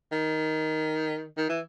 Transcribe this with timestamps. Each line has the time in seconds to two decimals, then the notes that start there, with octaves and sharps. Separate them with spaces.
0.12 D#3
1.37 D#3
1.49 E3